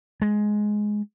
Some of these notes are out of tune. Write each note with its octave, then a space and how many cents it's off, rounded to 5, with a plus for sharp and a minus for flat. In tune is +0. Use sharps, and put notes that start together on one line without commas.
G#3 +10